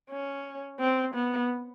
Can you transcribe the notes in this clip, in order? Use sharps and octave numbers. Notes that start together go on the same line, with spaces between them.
C#4
C4
B3